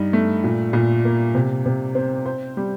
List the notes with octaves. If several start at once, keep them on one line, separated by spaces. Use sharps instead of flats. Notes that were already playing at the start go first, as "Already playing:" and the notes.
Already playing: G2 D#4
A3
A#2
A#2
A#3
C3
C3
C4
C5
G3